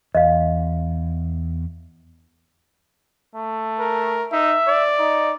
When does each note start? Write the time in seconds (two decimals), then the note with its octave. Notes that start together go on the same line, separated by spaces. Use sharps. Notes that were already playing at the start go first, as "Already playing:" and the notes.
0.15 E2 D#5 F5
3.35 A3
3.79 A#4
4.32 D#4 E5
4.67 D5
4.99 D#4